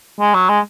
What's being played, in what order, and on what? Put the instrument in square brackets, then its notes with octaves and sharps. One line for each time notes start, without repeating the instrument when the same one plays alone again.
[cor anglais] G#3
F#3
G#3